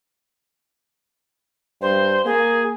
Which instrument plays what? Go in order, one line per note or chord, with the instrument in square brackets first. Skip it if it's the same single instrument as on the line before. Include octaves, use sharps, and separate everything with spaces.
[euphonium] G2 [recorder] C5
[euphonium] A#3 [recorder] G#4